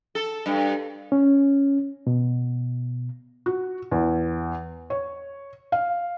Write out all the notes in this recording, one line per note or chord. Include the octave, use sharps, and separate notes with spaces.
A4
G2
C#4
B2
F#4
E2
C#5
F5